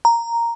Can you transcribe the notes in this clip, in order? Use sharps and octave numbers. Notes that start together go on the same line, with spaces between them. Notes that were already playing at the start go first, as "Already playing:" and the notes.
A#5